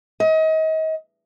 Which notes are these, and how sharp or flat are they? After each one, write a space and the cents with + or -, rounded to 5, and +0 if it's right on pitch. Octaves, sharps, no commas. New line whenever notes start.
D#5 +35